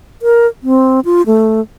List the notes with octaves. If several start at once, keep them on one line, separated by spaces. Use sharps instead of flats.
A#4
C4
F4
A3